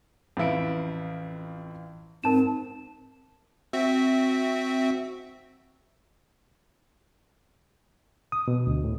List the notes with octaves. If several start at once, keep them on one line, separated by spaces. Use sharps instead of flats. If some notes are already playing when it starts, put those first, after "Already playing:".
A1 F2 E4 F5 D7
G#2 C4 A#4 A5 E7
C4 F#4 E5
D#6
B2
D2
A2